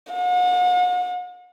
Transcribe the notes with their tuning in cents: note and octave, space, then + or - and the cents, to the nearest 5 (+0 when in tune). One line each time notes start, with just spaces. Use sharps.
F#5 -40